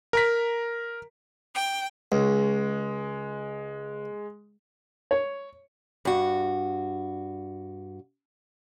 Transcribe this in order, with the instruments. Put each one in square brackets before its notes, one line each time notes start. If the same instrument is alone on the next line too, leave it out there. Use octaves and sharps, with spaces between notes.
[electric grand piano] A#4 A#5 B6
[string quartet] G5
[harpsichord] C#2 [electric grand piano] G#3
[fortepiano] C#5
[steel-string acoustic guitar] G2 F#4